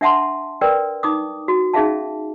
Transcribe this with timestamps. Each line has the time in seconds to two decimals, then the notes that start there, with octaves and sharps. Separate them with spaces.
0.01 D4 E5 F#5 A5 C6
0.61 A#4 B4 D5 G5
1.03 D#4 D6 D#6
1.48 F#4
1.73 C#4 D#4 G#4 E5 F5 A5